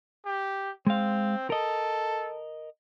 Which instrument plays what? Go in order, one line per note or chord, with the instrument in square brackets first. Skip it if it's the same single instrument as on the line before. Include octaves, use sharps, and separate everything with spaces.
[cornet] G4
[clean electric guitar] G#3 F5 [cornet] C4
[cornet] A4 [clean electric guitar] A#4 D#5